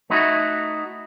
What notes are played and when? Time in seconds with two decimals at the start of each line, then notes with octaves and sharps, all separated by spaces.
0.10 A3 D#4 E4 F#4